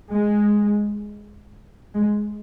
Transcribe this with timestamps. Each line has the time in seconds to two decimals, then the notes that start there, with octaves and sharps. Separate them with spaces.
0.11 G#3
1.95 G#3